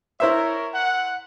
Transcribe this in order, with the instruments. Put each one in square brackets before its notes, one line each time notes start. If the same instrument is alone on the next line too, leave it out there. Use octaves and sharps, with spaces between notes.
[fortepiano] E4 C5 E5 [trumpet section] A#4 C#5
[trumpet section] F#5